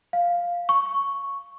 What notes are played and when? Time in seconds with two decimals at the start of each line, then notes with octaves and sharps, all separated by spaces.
0.13 F5
0.69 C#6